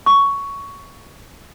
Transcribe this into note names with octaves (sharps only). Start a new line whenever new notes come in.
C#6